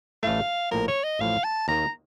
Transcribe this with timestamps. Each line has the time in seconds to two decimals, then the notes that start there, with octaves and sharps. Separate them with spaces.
0.23 A1 A2 A3 F5
0.71 A#1 A2 F3 A#3 A#4
0.88 C#5
1.03 D#5
1.19 A1 A2 F3 F5
1.44 A5
1.68 D#2 D#3 A#3 A#5